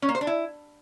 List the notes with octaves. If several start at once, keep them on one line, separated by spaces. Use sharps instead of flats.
C#4
A#3
C5
D4
E4